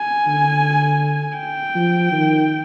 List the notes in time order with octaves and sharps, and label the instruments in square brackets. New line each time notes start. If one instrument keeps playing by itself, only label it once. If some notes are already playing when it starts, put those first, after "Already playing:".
Already playing: [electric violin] G#5
[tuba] D3
[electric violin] G5
[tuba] F3
D#3